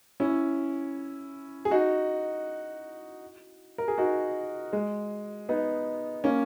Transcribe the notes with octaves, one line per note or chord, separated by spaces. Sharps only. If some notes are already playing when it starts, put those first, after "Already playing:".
C#4 E4
G#4
D#4 F#4
A#4
G#4
D#4 F#4
G#3
B3 D#4
A#3 C#4